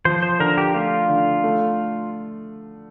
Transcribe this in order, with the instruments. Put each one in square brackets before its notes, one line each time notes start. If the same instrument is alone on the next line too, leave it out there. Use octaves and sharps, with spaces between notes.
[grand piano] F3 [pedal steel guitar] C5
[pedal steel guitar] C5
[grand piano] D3 [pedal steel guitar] A#4
[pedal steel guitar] G4
[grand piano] A3 [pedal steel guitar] F4
[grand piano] D3
A3